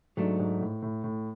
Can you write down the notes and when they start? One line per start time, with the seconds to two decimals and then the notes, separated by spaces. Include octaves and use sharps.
0.17 G#2 F#3 A3 D4
0.39 G#2
0.61 A2
0.82 A2
1.04 A2